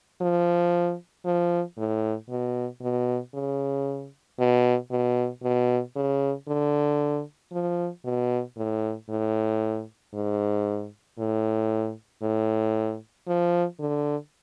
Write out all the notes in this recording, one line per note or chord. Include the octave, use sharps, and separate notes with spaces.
F3
F3
A2
B2
B2
C#3
B2
B2
B2
C#3
D3
F3
B2
A2
A2
G#2
A2
A2
F3
D3